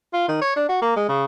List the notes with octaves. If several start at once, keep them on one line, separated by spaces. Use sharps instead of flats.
F4
D#3
C#5
D4
F#4
A#3
G#3
C#3